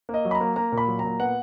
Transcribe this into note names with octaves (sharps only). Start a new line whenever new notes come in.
A#3
D#5
F#3
B5
A#5
A#3
A#3 A#5
A#2
B5
F#3
A#5
A#2
B3 F#5